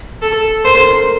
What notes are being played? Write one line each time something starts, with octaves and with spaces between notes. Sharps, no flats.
A4
A#4 C5
A4
A#4